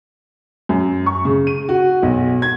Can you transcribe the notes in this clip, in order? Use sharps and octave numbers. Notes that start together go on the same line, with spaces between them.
F#2
C#6
C#3
D#7
F#4
B1
G#6